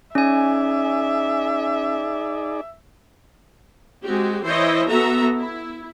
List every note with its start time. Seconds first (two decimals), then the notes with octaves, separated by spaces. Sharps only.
0.15 C#4 D#4 G#4 D5 E5 G#5
4.04 G#3 C4 F#4 G4
4.45 E3 E4 C5 C#5 D#5
4.89 B3 F#4 A4 E5 A#5
5.38 E4